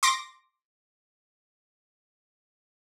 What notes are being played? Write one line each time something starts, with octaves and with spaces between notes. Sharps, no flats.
C6 D6 A#6